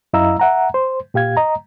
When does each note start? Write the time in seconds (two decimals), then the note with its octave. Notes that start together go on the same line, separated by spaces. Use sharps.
0.13 F#2 E4 D#5 F5 A#5 E6
0.40 E5 F#5 A#5
0.74 C5
1.14 A#2 G4 F5 G#6
1.37 D#5 A#5